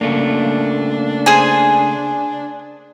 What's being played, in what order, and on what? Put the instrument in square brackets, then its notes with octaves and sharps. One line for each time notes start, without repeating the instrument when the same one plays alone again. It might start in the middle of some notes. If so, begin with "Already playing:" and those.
[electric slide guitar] C#3 A3 A#3 [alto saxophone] D4
[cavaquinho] G#4 C5 G#5